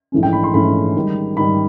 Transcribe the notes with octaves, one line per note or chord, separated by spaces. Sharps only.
A#1 G#2 E3 A3 C#4
G5
B5
C6
A#1 G#2 E3 A3 C#4 B5
G#2 D#3 G3
G#2 D#3 G3 B5